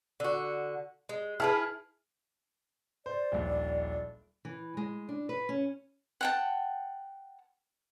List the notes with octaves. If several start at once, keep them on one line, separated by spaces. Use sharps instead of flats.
D3 F#4
G#3
E4 F#4 G#4 B4 A5 F6
C5 D5
D#1 A#1
E3
G#3
D4
B4
C#4
F#5 G5 A5